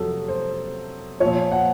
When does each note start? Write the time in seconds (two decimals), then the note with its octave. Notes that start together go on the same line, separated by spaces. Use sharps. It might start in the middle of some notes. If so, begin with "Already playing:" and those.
Already playing: F2 C3 F#3 A4
0.28 C5
1.20 A#2 F3 C#5
1.52 F#5